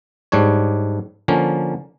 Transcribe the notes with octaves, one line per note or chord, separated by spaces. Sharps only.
G#2 G3 D4 C#5
D3 F3 A#3 C#4